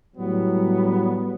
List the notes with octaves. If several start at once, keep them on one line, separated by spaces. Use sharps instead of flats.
A2 F#3 G3 B3